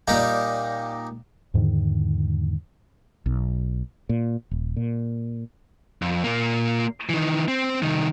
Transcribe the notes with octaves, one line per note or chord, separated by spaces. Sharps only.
A#2 G3 A#3 D#4 G4
E2 G#2 D3 D#3
B1
A#2
D#1
A#2
F2
A#2 A#3
D#3 E3
C4
C2 D#3